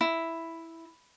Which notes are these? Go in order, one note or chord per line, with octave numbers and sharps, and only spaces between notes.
E4